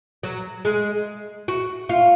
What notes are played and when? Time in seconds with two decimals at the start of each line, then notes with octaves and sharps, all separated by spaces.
0.23 F#3
0.65 G#3
1.48 F#4
1.89 F4